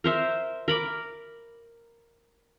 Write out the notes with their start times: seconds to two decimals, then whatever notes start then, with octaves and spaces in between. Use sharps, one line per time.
0.04 A#4 C5 E5
0.68 A#4 B5 D6